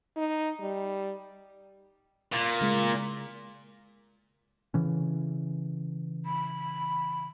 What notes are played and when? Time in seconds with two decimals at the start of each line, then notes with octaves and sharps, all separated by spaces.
0.17 D#4
0.60 G3
2.33 A#2
2.61 C#3 G#3 B6
4.74 C#3 E3 C#4
6.26 B5